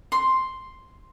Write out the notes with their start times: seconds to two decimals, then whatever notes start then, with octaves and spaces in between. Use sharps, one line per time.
0.12 C6